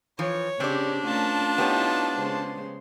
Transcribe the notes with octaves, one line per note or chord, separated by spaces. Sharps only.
E3 F3 C#5
C#3 C4 D4 G4 D5
A3 C#4 F4 A#4 A5
B3 D#4 E4 G4 C#5
C#3 G#3 C5